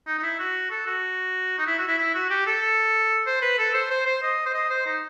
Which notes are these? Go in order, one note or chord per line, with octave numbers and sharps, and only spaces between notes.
D#4
D#4
E4
F#4
A4
F#4
D#4
E4
F#4
E4
E4
F#4
G4
A4
C5
B4
A4
C5
C5
C5
D#5
C5
D#5
C5
D#4